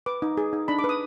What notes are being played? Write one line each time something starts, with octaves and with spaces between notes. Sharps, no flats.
B4 D6
D#4
G#4
D#4
D4 B5
D6
B4
D#6